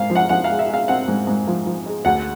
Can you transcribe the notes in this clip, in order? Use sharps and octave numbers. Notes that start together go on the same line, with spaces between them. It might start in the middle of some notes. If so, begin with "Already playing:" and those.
Already playing: G#2 F5
F3
F#5
F3 F#5
F5
G#3
E5
G#3 F5
C4 F#5
G#2
G#2
F3
F3
G#3
D2 F#5